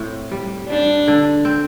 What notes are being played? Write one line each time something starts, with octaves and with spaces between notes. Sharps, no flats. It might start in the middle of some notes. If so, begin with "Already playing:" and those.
Already playing: A2 C4
G3
G3 D4
D3
C4